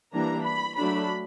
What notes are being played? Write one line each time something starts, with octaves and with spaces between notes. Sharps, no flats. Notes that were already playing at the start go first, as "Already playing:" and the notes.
E3 G3 A#3 D4 A#5
B5
F#3 A3 D4 B5